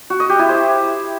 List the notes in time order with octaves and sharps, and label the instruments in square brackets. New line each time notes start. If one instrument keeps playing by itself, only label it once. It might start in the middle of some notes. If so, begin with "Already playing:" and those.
[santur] F#4
D#5
G4
E4
C5